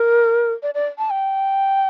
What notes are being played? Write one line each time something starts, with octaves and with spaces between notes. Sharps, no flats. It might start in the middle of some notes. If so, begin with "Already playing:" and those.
Already playing: A#4
D5
D5
A5
G5